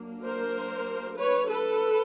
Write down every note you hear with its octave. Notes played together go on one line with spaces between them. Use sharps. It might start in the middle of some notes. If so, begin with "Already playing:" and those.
Already playing: F#3 A#3 D4
A#4 C5
B4 C#5
A4 B4